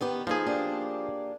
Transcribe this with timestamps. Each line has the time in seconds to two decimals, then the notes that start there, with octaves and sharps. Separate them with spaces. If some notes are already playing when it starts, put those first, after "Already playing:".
0.01 D#3 B3 G4
0.27 F3 A#3 D#4 G#4 A4
0.46 A#3 D4 G4